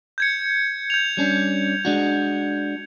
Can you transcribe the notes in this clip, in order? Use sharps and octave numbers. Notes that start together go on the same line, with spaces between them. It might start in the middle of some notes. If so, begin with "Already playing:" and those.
G6 G#6 C#7
G6 G#6 F7
G3 C#4 D4
G#3 D4 F#4